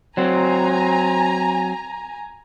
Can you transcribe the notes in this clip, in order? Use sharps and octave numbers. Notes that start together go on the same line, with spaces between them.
F#3 C4 G#5 A#5